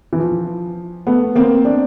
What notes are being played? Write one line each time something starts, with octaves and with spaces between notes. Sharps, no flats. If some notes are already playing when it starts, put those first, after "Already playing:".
E3
F3
A3 B3
A#3 C4
C4 D4